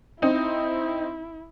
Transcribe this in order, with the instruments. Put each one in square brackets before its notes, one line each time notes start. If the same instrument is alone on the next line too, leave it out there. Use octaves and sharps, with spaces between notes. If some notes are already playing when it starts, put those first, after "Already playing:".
[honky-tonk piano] C4 D#4 [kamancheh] E4